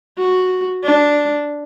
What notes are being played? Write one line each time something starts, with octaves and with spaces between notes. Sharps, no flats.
F#4
D4